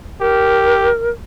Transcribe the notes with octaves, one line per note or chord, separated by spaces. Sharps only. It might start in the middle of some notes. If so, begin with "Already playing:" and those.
G4 A#4